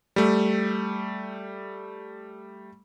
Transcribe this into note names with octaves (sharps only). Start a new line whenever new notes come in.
G3 A3